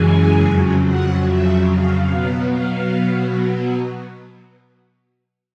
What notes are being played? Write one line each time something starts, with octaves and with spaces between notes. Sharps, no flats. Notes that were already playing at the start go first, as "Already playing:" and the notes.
Already playing: F#2 C#3 E3 G#3 G#5
F2 C#3 F#3
F#5
E5
F5
B2 F#3 B3
F5